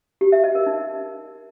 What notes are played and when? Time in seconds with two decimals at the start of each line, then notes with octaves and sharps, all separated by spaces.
0.21 G4
0.32 E5
0.44 D#5
0.55 A#4
0.67 D#4